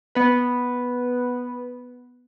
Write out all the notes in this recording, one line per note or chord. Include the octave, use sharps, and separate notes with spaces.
B3 B4